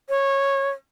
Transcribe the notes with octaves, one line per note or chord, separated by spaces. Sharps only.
C#5